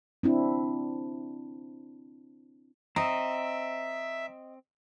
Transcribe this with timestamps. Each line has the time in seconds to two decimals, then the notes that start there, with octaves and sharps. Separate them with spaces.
0.23 C4 D4 E4
2.96 C4 D#5 E5 A#5 D#6